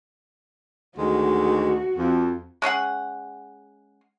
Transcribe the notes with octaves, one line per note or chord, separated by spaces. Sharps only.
D2 D#3 G#3 F#4
F2
G#3 C#4 G#4 F#5